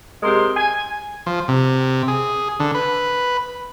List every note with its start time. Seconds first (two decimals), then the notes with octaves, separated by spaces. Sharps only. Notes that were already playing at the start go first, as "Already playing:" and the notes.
0.23 C3 G#3 A#4 C6
0.56 G#5
1.26 F3
1.48 C3
2.08 G#4
2.60 D3
2.75 B4